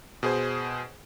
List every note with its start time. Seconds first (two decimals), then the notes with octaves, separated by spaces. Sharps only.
0.23 B2 G#4 C5